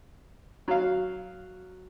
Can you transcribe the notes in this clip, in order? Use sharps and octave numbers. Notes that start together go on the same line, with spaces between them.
F#3 F5